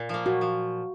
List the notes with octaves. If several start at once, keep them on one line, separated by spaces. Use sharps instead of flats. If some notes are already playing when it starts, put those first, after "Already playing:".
Already playing: A#2
F3 A#3
A#2 F#4
F3